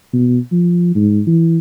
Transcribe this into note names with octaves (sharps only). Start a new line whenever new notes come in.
B2
F3
G#2
E3